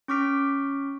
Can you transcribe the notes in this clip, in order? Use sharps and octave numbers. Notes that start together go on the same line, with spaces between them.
C#4 C#6 D6 F6 B6 D7